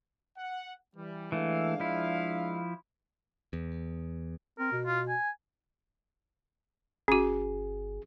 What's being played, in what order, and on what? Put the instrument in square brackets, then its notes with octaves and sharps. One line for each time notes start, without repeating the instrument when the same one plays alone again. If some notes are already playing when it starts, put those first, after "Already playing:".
[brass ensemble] F#5
E3 G3
[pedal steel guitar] E3 A3 [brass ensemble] G#3 D4 F5
[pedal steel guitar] F3 E4
[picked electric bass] E2
[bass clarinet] C4 [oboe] A#4
[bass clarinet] B2
[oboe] F4
G#5
[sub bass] G1 [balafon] C#4 F#4 [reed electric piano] G#4